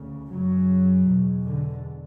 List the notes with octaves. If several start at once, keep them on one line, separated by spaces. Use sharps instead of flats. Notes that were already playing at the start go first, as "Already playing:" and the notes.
Already playing: D2 C#3
F#2 C#3 F#3
E2 B2
D3